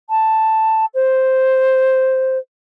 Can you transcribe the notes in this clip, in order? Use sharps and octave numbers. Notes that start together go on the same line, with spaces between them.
A5
C5